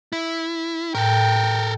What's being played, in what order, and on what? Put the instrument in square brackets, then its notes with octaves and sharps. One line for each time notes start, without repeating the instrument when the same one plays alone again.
[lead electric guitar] E4
[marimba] A2 [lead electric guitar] A4 A#4 [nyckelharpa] G5